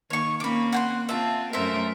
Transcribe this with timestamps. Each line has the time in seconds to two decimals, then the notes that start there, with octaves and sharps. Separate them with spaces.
0.10 D#3 A#3 C#5 C#6
0.40 A#3 C4 C#4 B5 D6
0.73 F#5 G5 C6
1.09 C4 F4 E5 A5
1.53 F#2 A3 A#4 C5 E5